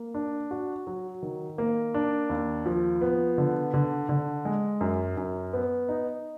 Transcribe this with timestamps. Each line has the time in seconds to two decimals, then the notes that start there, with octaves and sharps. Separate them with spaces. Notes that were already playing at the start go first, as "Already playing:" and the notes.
Already playing: A#3
0.14 D4
0.51 F#4
0.87 F#3
1.22 D#3
1.58 A#3
1.94 D4
2.30 D#2
2.66 F3
3.01 B3
3.38 D3
3.74 D3
4.09 D3
4.45 G#3
4.81 F#2
5.17 F#2
5.53 B3
5.89 D#4